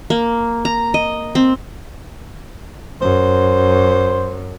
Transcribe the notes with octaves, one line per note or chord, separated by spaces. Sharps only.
A#3
A#5
D#5
C4
F#2 C5